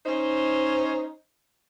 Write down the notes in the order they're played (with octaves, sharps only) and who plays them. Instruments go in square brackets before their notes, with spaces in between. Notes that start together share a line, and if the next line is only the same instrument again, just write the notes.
[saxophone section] C#4 D#4 C5